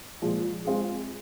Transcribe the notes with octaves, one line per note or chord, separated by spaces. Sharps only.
A#2 F3 G#3
G#3 C4 F4 G#4